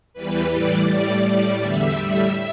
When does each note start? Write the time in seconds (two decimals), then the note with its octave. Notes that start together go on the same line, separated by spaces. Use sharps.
0.14 E2 E3 G3 B4
0.50 A2 E3 G3 D5
0.86 A2 G3 D5
1.22 A2 G3 D5
1.58 E2 D3 G3 E5
1.94 A2 G3